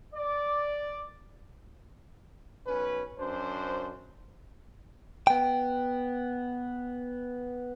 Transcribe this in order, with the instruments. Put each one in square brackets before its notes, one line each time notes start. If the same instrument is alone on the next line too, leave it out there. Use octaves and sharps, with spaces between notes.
[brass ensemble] D5
[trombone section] B1 C#4 B4
F#2 D4 C5
[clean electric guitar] B3 G5